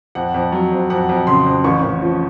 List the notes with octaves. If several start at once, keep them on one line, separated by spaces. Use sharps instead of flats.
F2 F#5
F2
F#3
F2
F2 F#5
F2
C#3 C6
F2
A1 C#6
A1
F3